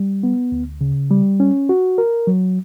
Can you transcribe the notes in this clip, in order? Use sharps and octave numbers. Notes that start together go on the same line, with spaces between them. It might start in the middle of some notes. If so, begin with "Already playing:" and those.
Already playing: G3
B3
D2
C#3
G3
C#4
F#4
A#4
F#3